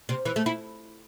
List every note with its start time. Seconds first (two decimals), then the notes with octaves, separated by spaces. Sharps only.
0.09 C3
0.25 E3
0.36 A3
0.46 E4